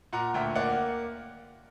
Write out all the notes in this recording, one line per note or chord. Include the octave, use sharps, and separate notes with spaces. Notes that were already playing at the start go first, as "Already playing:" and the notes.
A#2 F#5 A#5
D2 E5 G5
A#3 D5 F#5